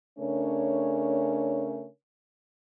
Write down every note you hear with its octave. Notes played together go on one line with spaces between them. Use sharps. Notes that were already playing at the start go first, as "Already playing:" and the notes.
C#3 A3 C#4 D4 A#4 C#5